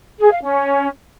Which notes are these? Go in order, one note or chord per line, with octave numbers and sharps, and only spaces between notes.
G#4
F5
C#4